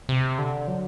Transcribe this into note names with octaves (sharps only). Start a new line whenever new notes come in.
C3
D3
F#3